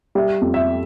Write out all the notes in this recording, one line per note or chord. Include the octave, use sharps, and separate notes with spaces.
G3 E5
F2
E5